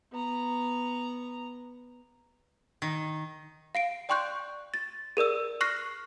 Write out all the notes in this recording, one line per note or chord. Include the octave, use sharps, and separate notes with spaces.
B3 A#5
D#3
F5 C7 D7
D5 G5 C6 C#6 F#6 G6
A6
G#4 A#4 D5 E6
C#6 F6 F#6 A#6 C7